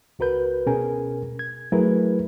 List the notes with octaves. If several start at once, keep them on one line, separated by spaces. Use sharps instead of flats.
C#2 F#4 A#4 B4 G6
B2 C#4 G#4 A#4 G#5
G#6
F#3 A3 E4 G#4 A#4 B4